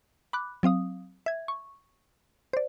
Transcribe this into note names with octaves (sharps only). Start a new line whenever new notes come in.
B5 D6 F#6
F#3 C4 F5 D#6
E5 G#6
C#6
C5 D5